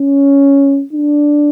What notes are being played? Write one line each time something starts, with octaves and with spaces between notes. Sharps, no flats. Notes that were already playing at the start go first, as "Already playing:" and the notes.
Already playing: C#4
D4